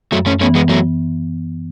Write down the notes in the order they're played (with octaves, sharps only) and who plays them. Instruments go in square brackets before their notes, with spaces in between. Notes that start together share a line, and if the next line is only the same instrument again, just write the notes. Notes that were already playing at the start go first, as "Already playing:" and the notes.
[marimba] F#2 [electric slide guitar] F#3 A3
[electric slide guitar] A3 C#4
[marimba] E3 B3 [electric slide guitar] A3 C#4
[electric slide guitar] G#3 B3
F#3 A3